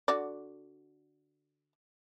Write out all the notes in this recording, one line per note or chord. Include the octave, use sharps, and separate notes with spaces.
D3 F#4 D5